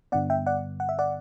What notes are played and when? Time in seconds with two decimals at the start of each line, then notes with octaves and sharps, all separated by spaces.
0.12 G2 D3 G3 B3 D5 F#5
0.30 E5 G5
0.46 D5 F#5
0.80 F#5
0.89 E5
0.99 D5 F#5